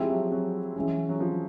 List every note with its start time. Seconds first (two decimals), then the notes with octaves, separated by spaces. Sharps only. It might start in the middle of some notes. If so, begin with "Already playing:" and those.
Already playing: F3 G#3 C4 E4 G4
0.10 F#3
0.32 F#3
0.76 E3 G#3 C#4
1.09 F#3
1.20 F3